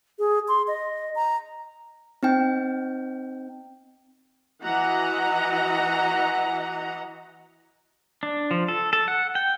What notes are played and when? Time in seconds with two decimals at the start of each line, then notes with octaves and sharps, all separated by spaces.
0.19 G#4
0.48 C6
0.68 D#5
1.15 A#5
2.23 C4 D#4 G5
4.62 E3 F#4 D#5 F#5 A#5
8.23 D4
8.51 F3
8.68 A4
8.93 A4
9.08 F#5
9.35 G5